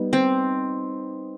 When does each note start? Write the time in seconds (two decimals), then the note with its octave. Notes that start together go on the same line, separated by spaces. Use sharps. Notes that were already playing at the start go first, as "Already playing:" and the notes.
Already playing: G3 B3 D#4
0.13 C4